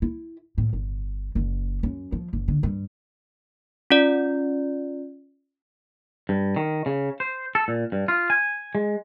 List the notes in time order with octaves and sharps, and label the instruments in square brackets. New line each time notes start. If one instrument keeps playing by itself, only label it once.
[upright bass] E4
A2
G1
F#1
F#2
F3
F#1
D3
G2
[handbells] C#4 F4 D5
[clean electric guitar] G2
D#3
C#3
C5
A4
A#2
G2
F4
G#5
G#3